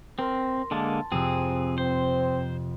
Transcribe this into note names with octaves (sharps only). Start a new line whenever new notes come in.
C4 A#4 C6
D3 G#3 A#3 A5
F2 C3 C4 G#4 E6
C4 C5